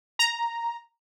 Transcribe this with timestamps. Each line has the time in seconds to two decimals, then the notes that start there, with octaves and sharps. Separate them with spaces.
0.19 A#5